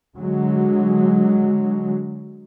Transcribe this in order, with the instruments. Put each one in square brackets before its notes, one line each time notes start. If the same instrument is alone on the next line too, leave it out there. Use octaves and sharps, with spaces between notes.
[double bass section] D3 F#3 G#3